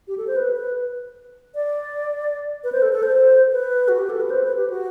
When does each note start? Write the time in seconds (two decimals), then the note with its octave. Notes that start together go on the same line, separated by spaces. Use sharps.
0.08 G4
0.18 A4
0.27 C5
0.36 B4
0.56 B4
1.55 D5
2.64 B4
2.72 C5
2.82 A4
2.92 A4
3.03 C5
3.52 B4
3.88 F#4
3.98 G4
4.10 A4
4.20 B4
4.30 C5
4.44 B4
4.57 G4
4.70 F#4